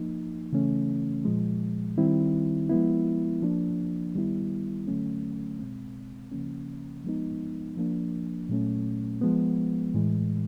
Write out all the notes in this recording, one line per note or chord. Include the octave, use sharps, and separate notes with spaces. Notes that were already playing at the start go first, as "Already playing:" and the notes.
Already playing: F3 A#3 D#4
C#3 E3 A3 C#4
A#2 F3 G#3
D#3 G3 C4 E4
F3 G#3 B3 E4
F3 A#3 D4
D#3 G3 B3 E4
D3 F#3 A3 C#4
B2 G#3 C4
C#3 F3 A#3 C#4
F3 G#3 B3 D#4
F3 A#3 D4
A#2 F#3 A3 C#4
F3 G#3 B3
A2 E3 G#3